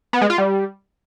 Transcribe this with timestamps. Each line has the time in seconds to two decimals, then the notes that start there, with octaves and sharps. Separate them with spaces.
0.13 B3
0.21 G#3
0.30 F4
0.38 G3